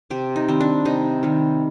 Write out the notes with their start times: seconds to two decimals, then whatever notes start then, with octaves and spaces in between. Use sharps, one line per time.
0.10 C3 G4
0.36 D#4
0.48 D#3 G3 C4
0.61 D4
0.85 C3 D#4
1.23 D#3 G3